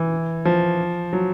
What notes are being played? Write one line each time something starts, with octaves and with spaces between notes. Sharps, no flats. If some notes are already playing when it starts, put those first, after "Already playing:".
Already playing: E3
F3
F#3